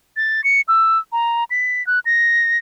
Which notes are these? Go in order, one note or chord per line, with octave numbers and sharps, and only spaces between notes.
A6
C#7
E6
A#5
B6
F#6
A#6